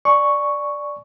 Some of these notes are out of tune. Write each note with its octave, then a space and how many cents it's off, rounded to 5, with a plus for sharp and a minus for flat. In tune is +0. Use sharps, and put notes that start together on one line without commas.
D5 +0 G#5 +20 C#6 +0